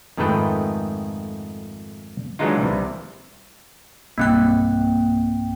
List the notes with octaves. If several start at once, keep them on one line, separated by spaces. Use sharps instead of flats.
F2 G#2 D#3 A3 B4 G5
E3 F#3 G#3 D4 D#4 F4
C2 C3
B1 G2 A#3 C4 G5 F#6